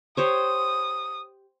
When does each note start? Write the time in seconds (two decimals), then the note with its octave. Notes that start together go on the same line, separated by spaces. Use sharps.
0.17 G4 C5 C#5 D#6